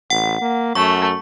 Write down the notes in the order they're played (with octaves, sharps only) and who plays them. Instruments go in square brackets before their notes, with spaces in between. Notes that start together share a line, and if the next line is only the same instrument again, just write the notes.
[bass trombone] A1 [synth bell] F#5
[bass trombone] A#3
[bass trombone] F#2 [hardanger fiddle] A3 [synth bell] C#6